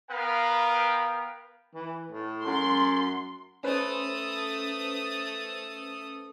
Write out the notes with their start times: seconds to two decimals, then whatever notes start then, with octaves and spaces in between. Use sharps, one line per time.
0.10 B3 A#4 B4 F5 G5
1.74 E3
2.12 A2
2.45 F#2 C6
3.64 A3 C#4 B4 C5 D#6